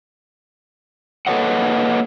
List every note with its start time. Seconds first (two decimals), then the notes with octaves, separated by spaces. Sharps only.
1.27 A#3 A4 B4 C#5 D#5 F#5